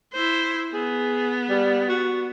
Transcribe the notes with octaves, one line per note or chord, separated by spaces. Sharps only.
E4 C5
B3 G#4
G3
F#4